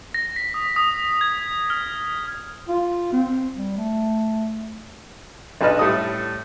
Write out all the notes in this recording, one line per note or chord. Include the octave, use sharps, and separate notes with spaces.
A#6
B6
D#6
D#6
G#6
F6
F4
C4
G3
A3
B1 D4 B4 D#5 F6
A2 G3 A4 D#6